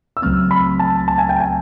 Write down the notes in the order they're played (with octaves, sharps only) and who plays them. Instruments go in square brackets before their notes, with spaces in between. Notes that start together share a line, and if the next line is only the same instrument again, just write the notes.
[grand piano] E6
[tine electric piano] C#2 C#3 F#3 A3 C4 [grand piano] F6
[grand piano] B5
A5
A5
G#5
G5
G#5